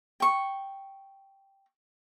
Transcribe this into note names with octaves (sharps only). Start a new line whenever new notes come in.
G5 C#6